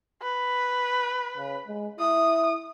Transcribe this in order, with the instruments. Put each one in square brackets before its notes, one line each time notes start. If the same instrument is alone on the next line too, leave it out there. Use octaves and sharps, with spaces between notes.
[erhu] B4
[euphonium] C#3
G#3
[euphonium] E4 [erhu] D#6